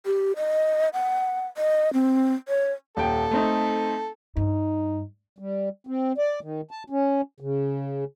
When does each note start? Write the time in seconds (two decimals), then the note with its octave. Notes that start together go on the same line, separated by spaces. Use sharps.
0.06 G4
0.36 D#5
0.93 F#5
1.57 D#5
1.93 C4
2.48 C#5
2.97 D#1 A4 G5
3.31 A3 C4 D#4
4.37 G2 D#4
5.39 G3
5.87 C4
6.18 D5
6.42 D#3
6.71 A5
6.90 C#4
7.40 C#3